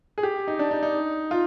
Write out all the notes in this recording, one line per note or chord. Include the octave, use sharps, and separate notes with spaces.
G#4
G4
D#4
D4
D#4
D#4
F4